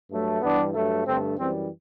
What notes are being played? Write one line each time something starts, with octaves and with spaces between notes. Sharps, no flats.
G2 F#3 A3
G2 E3 G3 B3 D4
G2 F#3 A3
G2 D3 A3 C4
F#2 E3 G3 C4